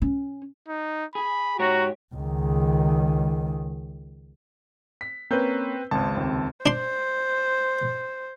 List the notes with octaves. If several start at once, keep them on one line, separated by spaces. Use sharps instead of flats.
C#4
D#4
G#4 B5
G#2 F#4 G4 C#5 A#5
C#2 D#3
B6
A#3 C4 C#4 B4 G6
G#1 C#2 A5
D#2 C3
D4 C5 C6